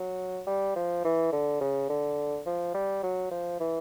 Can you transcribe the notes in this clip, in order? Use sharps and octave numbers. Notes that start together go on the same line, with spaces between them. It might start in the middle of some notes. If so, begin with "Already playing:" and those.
Already playing: F#3
G3
F3
E3
D3
C#3
D3
F3
G3
F#3
F3
E3